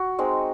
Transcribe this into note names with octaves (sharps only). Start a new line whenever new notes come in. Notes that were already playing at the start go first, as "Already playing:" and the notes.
Already playing: F#4
G#3 C4 D#4